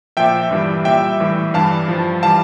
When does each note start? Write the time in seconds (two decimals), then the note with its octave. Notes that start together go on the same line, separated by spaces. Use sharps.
0.17 A#2 F3 E5 G5
0.51 G2 E3 G3
0.85 A#2 G3 E5 G5
1.20 A2 E3 G3
1.54 G2 E3 G3 F5 A5
1.88 G2 F3
2.23 E3 G3 F5 A5